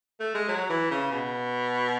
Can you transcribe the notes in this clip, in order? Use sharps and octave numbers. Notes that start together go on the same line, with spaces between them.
A3
G#3
F#3
E3
C#3
B2